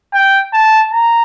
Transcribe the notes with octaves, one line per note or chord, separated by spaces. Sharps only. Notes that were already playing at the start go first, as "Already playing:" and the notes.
G5
A5
A#5